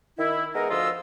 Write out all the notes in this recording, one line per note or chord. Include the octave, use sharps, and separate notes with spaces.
D#3 E4
G#3 B3 D#4 A#4
D2 F3 F4 D#5 E6